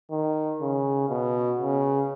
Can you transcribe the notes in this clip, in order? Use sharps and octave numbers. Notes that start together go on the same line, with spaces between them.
D#3
C#3
B2
C#3